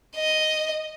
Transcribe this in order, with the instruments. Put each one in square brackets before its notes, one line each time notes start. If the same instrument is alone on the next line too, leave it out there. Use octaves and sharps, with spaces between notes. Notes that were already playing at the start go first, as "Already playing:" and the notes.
[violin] D#5